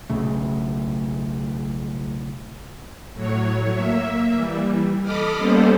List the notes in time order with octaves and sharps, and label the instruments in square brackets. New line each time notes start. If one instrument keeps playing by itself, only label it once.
[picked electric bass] B1 C#3 A3
[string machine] A2 F#3 C#5
A#3 E5
E3 G3
A4 D#5 B5 D6 D#6 F6
G3 A#3 B3 C#4 A4 C5